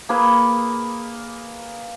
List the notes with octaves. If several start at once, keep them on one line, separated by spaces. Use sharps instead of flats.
A#3 G#4 B4 B5